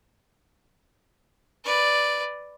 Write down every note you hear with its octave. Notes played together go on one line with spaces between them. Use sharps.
B4 D5